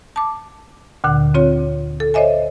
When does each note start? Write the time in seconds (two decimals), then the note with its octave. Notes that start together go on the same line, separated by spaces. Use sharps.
0.16 A5 D6
1.04 D2 A#2 D3 F#5
1.34 C4 F4 C#5
2.00 A4
2.14 C5 C#5 D#5 E5 G#5